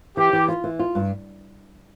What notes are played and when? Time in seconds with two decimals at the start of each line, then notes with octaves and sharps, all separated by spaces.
0.17 E3 G4
0.33 E3
0.48 F4
0.64 E3
0.79 F4
0.95 G2